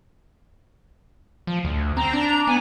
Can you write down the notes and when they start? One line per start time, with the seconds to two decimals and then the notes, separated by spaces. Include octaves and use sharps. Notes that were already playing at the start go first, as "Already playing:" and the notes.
1.47 F3
1.64 D2
1.97 C4 A#5
2.13 D4
2.47 B3 G#5